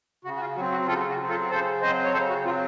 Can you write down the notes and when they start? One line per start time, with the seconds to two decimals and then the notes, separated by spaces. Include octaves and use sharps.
0.25 C#3 F#4
0.36 F#4
0.41 F4
0.56 F#3 C4 F#4
0.72 F#4
0.87 C#3 F4 A4
1.09 F#4
1.19 F#3 C4
1.29 F4 A4
1.50 C#3 A4 C5
1.81 F#3 C4 C5 D#5
2.05 C#5
2.13 C#3 A4 C5
2.29 F#4
2.45 F#3 C4 F4